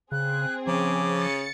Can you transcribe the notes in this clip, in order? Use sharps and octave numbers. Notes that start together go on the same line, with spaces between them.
C#3 C4 G#4 F#6
C#3 F3 D6
A6 C#7